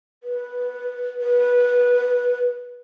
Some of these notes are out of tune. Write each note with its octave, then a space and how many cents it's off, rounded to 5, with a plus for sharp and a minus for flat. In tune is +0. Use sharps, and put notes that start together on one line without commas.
B4 -10
B4 -15